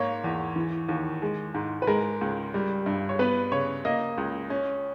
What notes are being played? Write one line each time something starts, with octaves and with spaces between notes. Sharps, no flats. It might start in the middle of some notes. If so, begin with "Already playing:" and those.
Already playing: G#2 A#3 C#5
E2
E3
D#2
G#3
G#2
B4
G#3 A#4
C#2
G3
G2
C#5
B3 B4
C#3 C#5
A#3 D#5
C#2
C#4